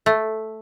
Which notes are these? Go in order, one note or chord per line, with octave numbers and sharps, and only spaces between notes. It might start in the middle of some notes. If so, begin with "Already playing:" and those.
A3